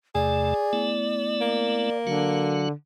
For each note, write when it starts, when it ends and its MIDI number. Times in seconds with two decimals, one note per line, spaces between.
0.15 0.54 40
0.15 0.54 48
0.15 0.54 57
0.15 0.92 68
0.15 1.97 74
0.73 1.90 57
0.73 1.90 59
0.73 1.90 64
1.41 2.65 58
2.07 2.72 50
2.07 2.68 54
2.07 2.68 66
2.07 2.68 77